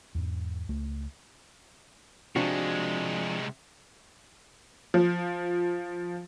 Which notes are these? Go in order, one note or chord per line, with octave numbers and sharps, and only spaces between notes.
E2 G#2
C#2 A3
C3 F3 G#3 D4 F#4
F3